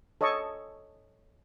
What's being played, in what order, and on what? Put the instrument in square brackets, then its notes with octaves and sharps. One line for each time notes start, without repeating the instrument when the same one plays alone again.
[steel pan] A4 C#5 D#5 A5 C#6